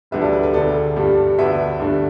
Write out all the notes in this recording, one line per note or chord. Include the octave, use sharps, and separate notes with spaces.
E1 D2 D3 G3 B4 E5
A4 D5
B4
B4
E1 D2 D3 A4 D5
G2 G3 D4
D2 D3 B3 D4 B4 E5
G2 D3 A3 D4